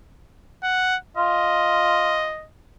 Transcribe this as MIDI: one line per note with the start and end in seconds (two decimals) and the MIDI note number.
0.63 0.97 78
1.17 2.31 65
1.17 2.47 75